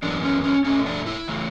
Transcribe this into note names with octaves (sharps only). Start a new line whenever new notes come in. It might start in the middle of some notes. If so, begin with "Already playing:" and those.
F#2 E3 B3 D4
C#4
C#4
B2 A3 C#4
D4
E4
C#3 E3 A3